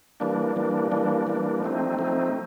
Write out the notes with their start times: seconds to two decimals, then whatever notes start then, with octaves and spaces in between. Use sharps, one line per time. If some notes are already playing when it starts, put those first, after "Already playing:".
0.20 E3 G3 A#3 D4
0.56 E3 G3 A#3 D4
0.91 E3 G3 A#3 D4
1.27 E3 G3 A#3 D4
1.63 F3 A3 C4 D#4
1.99 F3 A3 C4 D#4